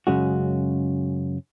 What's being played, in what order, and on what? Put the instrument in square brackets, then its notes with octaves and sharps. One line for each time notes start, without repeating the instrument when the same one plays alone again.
[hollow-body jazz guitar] F#2 C#3 G#3 C#4 F#4